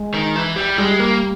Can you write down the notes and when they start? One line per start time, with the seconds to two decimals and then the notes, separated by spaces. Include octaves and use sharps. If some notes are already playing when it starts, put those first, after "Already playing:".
Already playing: G#3
0.14 D#3
0.36 E3
0.56 G3
0.77 G3 G#3
1.00 A#3